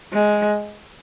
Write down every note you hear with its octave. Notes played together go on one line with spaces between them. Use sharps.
G#3